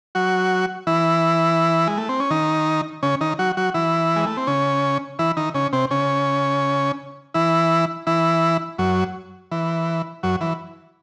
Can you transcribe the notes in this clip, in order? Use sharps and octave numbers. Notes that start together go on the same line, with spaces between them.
F#3 F#4
E3 E4
G#3
A3
C4
C#4
D#3 D#4
C#3 C#4
D#3 D#4
F#3 F#4
F#3 F#4
E3 E4
G#3
A3
C4
C#3 C#4
E3 E4
D#3 D#4
C#3 C#4
C3 C4
C#3 C#4
E3 E4
E3 E4
F#2 F#3
E3
F#2 F#3
E3